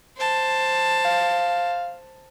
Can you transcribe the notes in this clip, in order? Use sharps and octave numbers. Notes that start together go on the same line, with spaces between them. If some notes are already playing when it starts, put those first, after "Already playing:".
C5 A5
F5